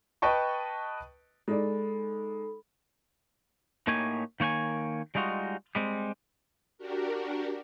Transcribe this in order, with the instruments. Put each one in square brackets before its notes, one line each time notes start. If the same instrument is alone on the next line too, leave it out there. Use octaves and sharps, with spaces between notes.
[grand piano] B4 D#5 G5 A5 C#6
[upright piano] G#3 D#4 D5 [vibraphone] A4 B5
[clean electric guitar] A2 A#3 D#4 G4 C#5 G#5
D#3 A#3 C#5 G5 G#5
G3 G#3 D#4 F4 F#4
G3 G#3 C4
[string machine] D4 F#4 G4 A#4